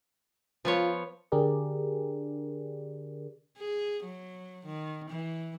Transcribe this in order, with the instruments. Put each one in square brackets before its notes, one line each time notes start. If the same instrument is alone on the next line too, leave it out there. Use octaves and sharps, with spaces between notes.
[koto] F3 B3 C#5 [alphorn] F4
[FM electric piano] D3 D4 G4 G#4 A#4 D5
[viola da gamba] G#4
F#3
D#3
E3